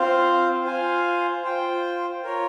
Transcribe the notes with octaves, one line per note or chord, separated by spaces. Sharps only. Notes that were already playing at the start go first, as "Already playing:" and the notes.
Already playing: C4 F4 C5 F5
F4 C5 F5 G#5
F4 C5 G5
F4 A#4 C#5